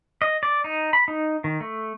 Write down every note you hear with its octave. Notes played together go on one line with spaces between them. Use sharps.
D#5
D5
D#4
B5
D#4
D#3
A3